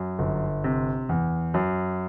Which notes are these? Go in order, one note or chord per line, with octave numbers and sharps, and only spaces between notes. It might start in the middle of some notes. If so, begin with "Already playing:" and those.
Already playing: F#2
G1
C3
E2
F#2